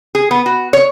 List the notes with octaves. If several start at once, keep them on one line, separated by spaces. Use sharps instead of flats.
G#4
B3
F#4
C#5